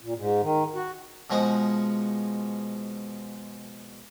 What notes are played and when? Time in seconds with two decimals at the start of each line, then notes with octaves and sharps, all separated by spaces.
0.01 A#2
0.17 G#2
0.43 D#3
0.75 F#4
1.30 B2 F3 G#3 F#5